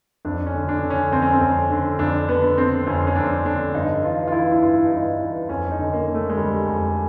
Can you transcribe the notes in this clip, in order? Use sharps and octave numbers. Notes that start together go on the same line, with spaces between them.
F2 D4
C#4
D3
D4
D3
C#4
F2 C4
C#4
C4
F2
D3
F2 D4
D3 B3
D3 C4
F2 C#4
C#4
F2 D4
D3 D4
G2 D#4
E3 F4
F4
E3 E4
E4
G2 F4
D#4
G2 E4
E3
F2 C#4
D#4
D3
A#3
D3
A3
G#3
F2 G3
F2